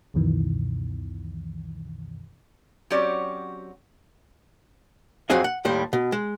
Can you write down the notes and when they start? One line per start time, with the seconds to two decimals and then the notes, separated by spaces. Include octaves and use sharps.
0.14 C#2 F#2 B2 D#3 E3
2.90 F#3 C4 C#4 F#4 G4 D5
5.30 F2 F#3 C4 F#4 G#4 E5
5.44 F#5
5.65 D#2 A2 G3 C5
5.93 B2
6.12 G#3